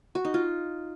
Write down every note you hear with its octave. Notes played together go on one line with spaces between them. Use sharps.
F#4
D#4
F4